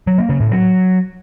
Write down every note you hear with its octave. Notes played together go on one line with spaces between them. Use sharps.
F#3
A#3
C#3
A2
F#3